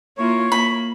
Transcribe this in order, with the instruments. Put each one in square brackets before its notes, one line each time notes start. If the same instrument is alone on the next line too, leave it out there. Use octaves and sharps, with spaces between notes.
[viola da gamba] A#3 E4 F4 [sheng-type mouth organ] C#5
[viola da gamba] A#3 [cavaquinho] B5